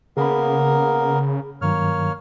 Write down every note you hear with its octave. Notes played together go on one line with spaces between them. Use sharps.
C#3 A#3 B3 G#4 A#4 B5
G2 D#3 F#3 A#3 C#5 F6